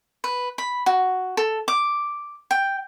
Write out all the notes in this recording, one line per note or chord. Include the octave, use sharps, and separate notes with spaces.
B4
B5
F#4
A4
D6
G5